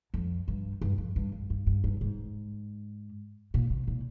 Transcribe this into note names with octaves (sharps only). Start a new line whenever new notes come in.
F2
G2
G2
F2
G2
G2
G2
G2
G2
G#2
A#2
C3
A#2